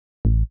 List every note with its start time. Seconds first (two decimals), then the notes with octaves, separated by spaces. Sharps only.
0.25 A1